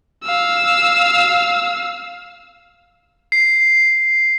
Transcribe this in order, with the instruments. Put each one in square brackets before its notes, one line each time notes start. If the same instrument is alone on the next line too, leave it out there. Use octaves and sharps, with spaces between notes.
[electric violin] F5 E6
[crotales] C7